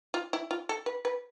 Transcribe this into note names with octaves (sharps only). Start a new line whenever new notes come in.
F4
E4
F4
A4
B4
B4